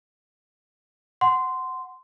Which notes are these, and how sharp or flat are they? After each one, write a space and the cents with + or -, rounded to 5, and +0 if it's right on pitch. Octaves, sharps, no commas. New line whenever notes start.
F#5 +0 C6 -10